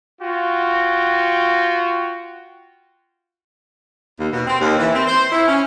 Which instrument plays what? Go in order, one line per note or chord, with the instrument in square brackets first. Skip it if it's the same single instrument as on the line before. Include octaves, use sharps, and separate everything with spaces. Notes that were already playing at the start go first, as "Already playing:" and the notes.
[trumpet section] F4 F#4 G5
[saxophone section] D#2
B2
C4
D#2
E3
C4
C5
E4
C#4